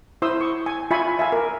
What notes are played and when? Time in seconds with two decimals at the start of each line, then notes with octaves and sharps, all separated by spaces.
0.22 E4 C5 C6 D#6 E6
0.41 C#6
0.66 G#5
0.91 F4 E5 G#5 B5 C#6
1.19 E5 F5 G#5
1.32 A#4